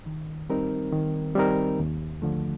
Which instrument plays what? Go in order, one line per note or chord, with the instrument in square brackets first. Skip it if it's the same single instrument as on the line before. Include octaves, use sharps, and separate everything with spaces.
[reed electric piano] D#3
G3 C4 D#4 A#4
D#3
G3 C4 D#4 A#4
D#2
D3 F3 A3